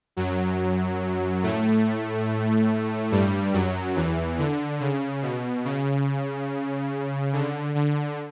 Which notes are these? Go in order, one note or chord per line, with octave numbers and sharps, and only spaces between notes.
F#2 F#3
A2 A3
G2 G3
F#2 F#3
E2 E3
D3
C#3
B2
C#3
D3
D3